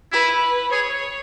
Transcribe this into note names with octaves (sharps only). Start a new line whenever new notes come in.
E4 B4
G#4 C#5